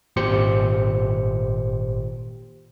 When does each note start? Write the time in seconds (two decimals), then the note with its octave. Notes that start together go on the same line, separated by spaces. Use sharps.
0.16 G#1 A#2 G4 C5 C#7